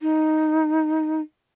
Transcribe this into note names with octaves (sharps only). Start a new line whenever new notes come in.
D#4